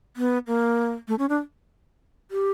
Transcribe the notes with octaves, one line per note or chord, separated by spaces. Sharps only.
B3
A#3
A3
C#4
D4
G4